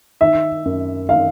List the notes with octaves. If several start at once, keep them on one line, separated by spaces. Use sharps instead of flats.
D#3 E5
F#2
D#3 F5